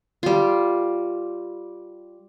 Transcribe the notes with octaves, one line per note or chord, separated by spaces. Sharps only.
G3 F4